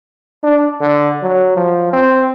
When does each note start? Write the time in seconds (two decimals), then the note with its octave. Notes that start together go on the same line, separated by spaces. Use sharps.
0.44 D4
0.81 D3
1.23 F#3
1.57 F3
1.93 C4